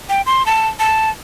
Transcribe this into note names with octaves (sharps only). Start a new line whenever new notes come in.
G5
C6
A5
A5